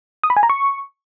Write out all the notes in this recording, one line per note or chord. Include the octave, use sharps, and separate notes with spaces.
D#6
B5
G#5
A#5
C#6